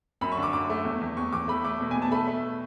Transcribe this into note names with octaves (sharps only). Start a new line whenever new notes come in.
F#2 B5
C#6
D3
D6
F#2 D6
A3
E2
E2
E2 C#6
E2 D6
A3 B5
A3 D6
B2
B2 G#5
A5
A3 B5
A3